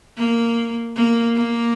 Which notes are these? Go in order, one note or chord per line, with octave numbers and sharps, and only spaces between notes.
A#3
A#3
A#3